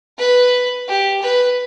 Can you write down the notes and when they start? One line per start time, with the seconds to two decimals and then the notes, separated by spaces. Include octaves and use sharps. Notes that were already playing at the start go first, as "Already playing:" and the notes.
0.18 B4
0.88 G4
1.22 B4